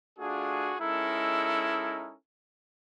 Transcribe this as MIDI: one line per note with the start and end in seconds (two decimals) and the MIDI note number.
0.18 0.74 57
0.18 0.74 62
0.18 0.74 65
0.18 0.74 66
0.18 0.74 68
0.81 2.15 56
0.81 2.15 61
0.81 2.15 63
0.81 2.15 64
0.81 2.15 69
0.81 2.15 70